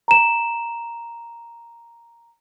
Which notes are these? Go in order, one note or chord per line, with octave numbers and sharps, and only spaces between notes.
A#5 E7